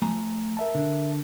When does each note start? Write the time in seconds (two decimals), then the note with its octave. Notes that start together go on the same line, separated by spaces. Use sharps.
0.02 F3 A3 G#5 A#5
0.57 A#4 E5 A5
0.75 D3